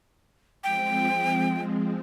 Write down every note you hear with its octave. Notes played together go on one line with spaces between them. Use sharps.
F3 G#3 C4 G5